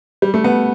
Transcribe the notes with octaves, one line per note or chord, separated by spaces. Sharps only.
G3
A3
B3